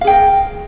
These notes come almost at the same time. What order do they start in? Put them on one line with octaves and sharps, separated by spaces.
F5 G#4 G5 A#4